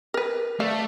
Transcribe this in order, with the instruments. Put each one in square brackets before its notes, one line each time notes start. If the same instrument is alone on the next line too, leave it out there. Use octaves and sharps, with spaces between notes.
[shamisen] A#4 B4
[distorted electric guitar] A3 [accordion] D5 E5 A5 [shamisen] F5